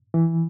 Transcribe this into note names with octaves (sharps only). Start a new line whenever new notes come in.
E3